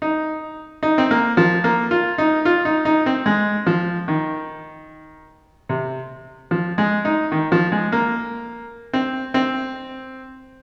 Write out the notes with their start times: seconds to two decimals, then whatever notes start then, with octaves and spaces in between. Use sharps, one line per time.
0.02 D#4
0.83 D#4
0.98 C4
1.11 A#3
1.37 F3
1.64 A#3
1.91 F4
2.18 D#4
2.45 F4
2.65 D#4
2.85 D#4
3.06 C4
3.26 G#3
3.66 F3
4.08 D#3
5.69 C3
6.51 F3
6.78 G#3
7.05 D#4
7.32 D#3
7.52 F3
7.72 G#3
7.92 A#3
8.93 C4
9.34 C4